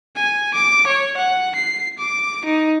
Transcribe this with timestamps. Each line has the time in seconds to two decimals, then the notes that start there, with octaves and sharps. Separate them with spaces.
0.16 G#5
0.54 D6
0.87 C#5
1.17 F#5
1.56 C7
1.98 D6
2.45 D#4